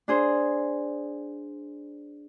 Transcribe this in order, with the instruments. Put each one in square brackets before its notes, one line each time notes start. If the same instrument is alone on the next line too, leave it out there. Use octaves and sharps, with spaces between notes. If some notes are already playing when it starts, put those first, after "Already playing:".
[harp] D4 G#4 C5